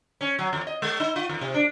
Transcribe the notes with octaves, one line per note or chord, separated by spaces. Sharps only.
C#4
F#3
E2
D#5
G#3
D#4
F4
E2
C3
D4